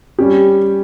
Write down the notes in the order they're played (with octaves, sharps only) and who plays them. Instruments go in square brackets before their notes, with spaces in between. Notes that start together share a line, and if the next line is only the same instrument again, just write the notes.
[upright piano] G3 C#4 G4